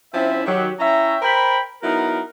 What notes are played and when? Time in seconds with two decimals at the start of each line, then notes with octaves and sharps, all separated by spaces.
0.14 F3 C4 C#4 E4 E5
0.45 D#3 F#3 G4
0.79 C#4 E4 C#5 E5 G5 A#5
1.22 A#4 C5 G5 B5
1.83 F#3 B3 D#4 E4 A#4